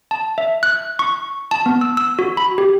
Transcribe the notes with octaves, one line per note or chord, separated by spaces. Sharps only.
A5
E5
F#6
C#6
A5
B3
E6
E6
F#4
B5
G4